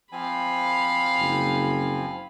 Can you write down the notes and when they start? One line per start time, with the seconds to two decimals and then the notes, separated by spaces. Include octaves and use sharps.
0.12 F3 C4 F5 G#5 B5
1.20 F#1